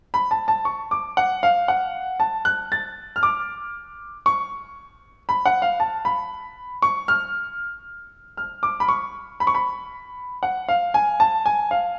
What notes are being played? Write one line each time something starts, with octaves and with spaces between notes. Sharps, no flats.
B5
A5
A5
C#6
D6
F#5
F5
F#5
A5
F#6
A6
F6
D6
C#6
B5
F#5
F5
A5
B5
C#6
F6
F6
D6
B5
C#6
B5
C#6
B5
F#5
F5
G#5
A5
G#5
F5